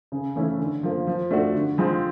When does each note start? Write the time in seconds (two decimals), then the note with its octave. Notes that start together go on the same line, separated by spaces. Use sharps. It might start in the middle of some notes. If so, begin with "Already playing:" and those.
0.12 C#3
0.36 E3 A3 C#4 E4
0.59 D3
0.83 F3 A#3
1.07 F3
1.31 A3 D4 F#4
1.55 D3
1.78 F3 G#3 C4